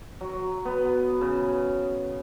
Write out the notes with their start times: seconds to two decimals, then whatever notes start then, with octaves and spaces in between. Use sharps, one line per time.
0.21 F#3
0.65 B3
1.21 C#3